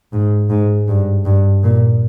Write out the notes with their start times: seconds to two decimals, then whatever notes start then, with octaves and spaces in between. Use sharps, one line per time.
0.13 G#2
0.50 G#2
0.88 G2
1.25 G2
1.63 A#2